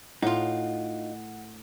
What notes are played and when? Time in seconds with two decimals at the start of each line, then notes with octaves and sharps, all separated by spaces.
0.23 A2 D#4 F4 F#5